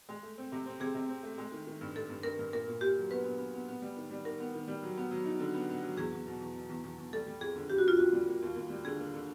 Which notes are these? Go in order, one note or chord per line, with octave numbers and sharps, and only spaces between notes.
G#3
A3
C4
C3
C4
C3 G#4
C3
C4
A3
G#3
D#3
D#3
G2
G2 A4
G2
G2 A#4
G2
A#2 A#4
A#2
A#2 G4
F#3
B3 B4
B3
B3
B3
B3
G3
D#3
G3
D#3 A#4
B3
D#3
G3
F#3
B3
F#3
D#4
D3
B3
B3
F#3
E2 G#4
E2
B2
E2
B2
E2
E2
E2
G3 A4
G3
F2 G#4
D3
F2 G4
F#4
A#3 F4
F2 F#4
G3
A#3
D#2
D#2
G3
D3 G#4
A#3
D3